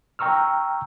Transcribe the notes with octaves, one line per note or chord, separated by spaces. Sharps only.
G5 A#5 C#6 E6 F6